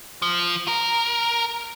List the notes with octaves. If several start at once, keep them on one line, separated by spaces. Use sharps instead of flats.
F3
A#4